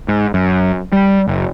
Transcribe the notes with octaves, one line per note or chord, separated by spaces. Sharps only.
G#2
F#2
G3
F#1